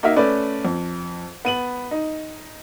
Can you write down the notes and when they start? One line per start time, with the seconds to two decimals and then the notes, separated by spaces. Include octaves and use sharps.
0.03 A#3 D#4 F#4 A#4 E5
0.16 A3 C#4 B4 D5
0.65 F2
1.45 B3 D#7 F#7
1.91 D#4